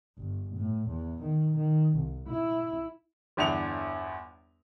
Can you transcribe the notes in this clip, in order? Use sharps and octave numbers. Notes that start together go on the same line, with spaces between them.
G1
A2
E2
D#3
D#3
C2
E4
G1 E2 D4 F7